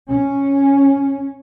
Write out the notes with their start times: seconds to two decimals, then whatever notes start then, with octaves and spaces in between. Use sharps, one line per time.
0.10 C#4